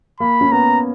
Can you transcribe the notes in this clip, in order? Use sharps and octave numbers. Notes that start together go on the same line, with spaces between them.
A#3 B5
C#4
B3 A#5